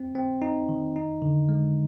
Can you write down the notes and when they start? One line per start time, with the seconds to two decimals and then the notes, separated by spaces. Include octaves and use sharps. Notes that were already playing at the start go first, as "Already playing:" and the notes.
Already playing: C4
0.15 C4
0.42 D#4
0.69 D#3
0.96 D#4
1.22 D3
1.49 G#3